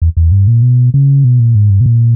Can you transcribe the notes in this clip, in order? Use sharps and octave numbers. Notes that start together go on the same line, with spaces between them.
E2
E2
G2
A#2
B2
C#3
B2
A#2
G#2
G2
B2
A#2